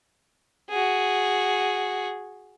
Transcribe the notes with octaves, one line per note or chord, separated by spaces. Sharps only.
F#4 G#4